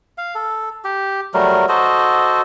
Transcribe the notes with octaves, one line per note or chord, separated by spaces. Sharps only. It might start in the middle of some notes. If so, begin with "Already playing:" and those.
F5
A4
G4
F#3 G3 A3 A#4
F#4 A4 C5 D#5